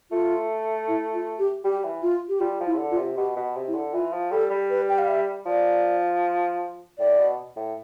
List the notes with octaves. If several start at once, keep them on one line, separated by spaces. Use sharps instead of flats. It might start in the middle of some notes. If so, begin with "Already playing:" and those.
A3 F4
E4
F4
G4
G3 G4
E3
F4
G4
G3 F4
F3
E4
C3
D3
F4
C3
B2 G4
B2
C3
E4
D3
E3 F4
F3
G3 A4
G3
B4
G5
F5
E5
F3 D5
A2 D5
B2
A2